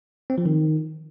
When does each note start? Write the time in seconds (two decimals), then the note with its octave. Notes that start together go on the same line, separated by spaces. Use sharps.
0.30 C4
0.38 F3
0.46 D#3